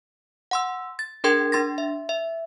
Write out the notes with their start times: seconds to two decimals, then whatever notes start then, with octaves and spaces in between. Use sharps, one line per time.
0.51 F#5 C6 E6
0.99 A6
1.24 D4 G#4 A#4 G5 C6 G#6
1.52 D4 C6 A6 A#6
1.78 E5
2.09 E5